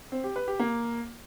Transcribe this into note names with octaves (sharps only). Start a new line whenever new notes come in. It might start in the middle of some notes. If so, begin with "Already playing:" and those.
C4
G4
B4
G4
A#3